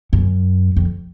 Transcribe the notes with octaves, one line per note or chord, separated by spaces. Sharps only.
F#2
F2